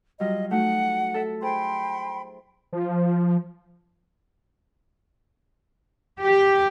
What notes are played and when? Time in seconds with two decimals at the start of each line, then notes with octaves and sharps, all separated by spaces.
0.20 F#3 G3 F4 D#5
0.51 A3 D#4 F#4 F#5
1.14 A4 E5
1.42 G#4 C5 G5 B5 C6
2.73 F3
6.21 G4